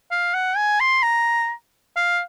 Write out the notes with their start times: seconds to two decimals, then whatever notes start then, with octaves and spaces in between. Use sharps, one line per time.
0.11 F5
0.34 F#5
0.57 G#5
0.81 C6
1.03 A#5
1.96 F5